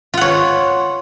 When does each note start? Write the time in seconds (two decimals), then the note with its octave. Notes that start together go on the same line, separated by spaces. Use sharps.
0.14 F4
0.17 F#5
0.21 C#5